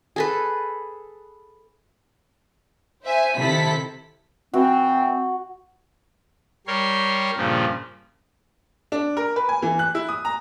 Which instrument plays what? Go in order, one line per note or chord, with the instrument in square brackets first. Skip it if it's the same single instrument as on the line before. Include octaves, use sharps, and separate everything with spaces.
[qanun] G#4 A4 B4
[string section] C5 E5 G#5
C3 D#3 E4 A4 B6
[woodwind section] E3 C4 [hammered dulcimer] F#4
[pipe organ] G3 A#4 C#5 C6
G2 A#2 C#3 F3
[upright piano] D4
A#4
B4
G#5
E3
F#6
E4
D#6
A#5